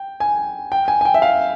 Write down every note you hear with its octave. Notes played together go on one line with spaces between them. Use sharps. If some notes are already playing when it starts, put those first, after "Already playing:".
Already playing: G5
G#5
G5
G#5
G#5
G5
E5
F5